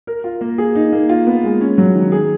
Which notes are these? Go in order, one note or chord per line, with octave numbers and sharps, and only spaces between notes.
A#4
F4
A#3
G#4
D#4
A#3
F4
B3
G#3
C#4
F#3
D#3
G#4